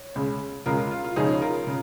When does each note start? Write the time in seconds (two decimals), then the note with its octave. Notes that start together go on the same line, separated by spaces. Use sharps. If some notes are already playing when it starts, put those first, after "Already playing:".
Already playing: C#5
0.15 C#2 C#3 G#3
0.66 C#2 C#3 G#3 F4 A#4
0.78 F4
0.91 F4
1.04 F4
1.16 C#2 C#3 F3 C#4 D#4 G#4
1.42 F4 A#4
1.67 C#3